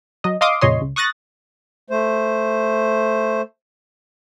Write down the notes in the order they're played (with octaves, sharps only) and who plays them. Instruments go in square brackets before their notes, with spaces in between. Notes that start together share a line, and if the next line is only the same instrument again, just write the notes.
[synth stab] F#3 D#5
D#5 F5 C6 D6 D#6
F2 A#2 C#3 C#5 D#5 C6
C#2
C#6 D#6 F#6 A6 A#6
[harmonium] A3 C5